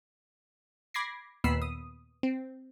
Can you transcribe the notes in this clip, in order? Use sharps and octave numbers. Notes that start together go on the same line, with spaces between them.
B5 D6 G#6 A#6 C7
D#2 A#2 B3 B5 E6 C7
D#6
C4